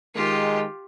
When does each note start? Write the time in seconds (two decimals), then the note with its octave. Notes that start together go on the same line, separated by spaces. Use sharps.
0.15 D#3 G#3 F4 G4